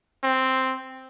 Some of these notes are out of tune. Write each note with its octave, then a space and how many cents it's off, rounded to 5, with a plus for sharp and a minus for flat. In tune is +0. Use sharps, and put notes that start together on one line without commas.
C4 +0